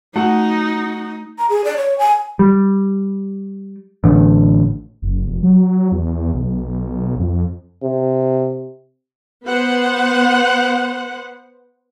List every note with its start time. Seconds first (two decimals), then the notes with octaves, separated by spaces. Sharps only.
0.16 A3 D#4 F#4 F#5
1.38 A#5
1.49 G#4
1.65 D5
1.77 C#5
1.99 G#5
2.39 G3
4.04 A1 D3
5.02 F#1
5.28 F1
5.43 F#3
5.92 E2
6.34 B1
7.19 F2
7.83 C3
9.45 B3 B4 C5 F#5